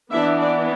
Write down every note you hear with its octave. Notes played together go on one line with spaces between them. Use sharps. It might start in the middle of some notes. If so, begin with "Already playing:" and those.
E3 B3 D4 E4 E5
D4 D5